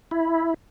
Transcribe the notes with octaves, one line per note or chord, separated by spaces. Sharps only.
E4